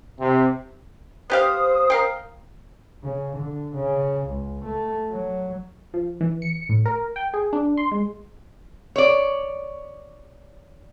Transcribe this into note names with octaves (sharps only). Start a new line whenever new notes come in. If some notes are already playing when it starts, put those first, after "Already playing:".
C3
B3 G4 C5 F5 D#6
A#4 F5 G5
C#3
D3
C#3
C#2
A3
F#3
F3
E3
C#7
A2
A#4
G5
G#4
D4
C6
G#3
C#5 D5